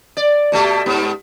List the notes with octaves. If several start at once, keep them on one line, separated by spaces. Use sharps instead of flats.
D5
B2 A3 G4
G#2 B3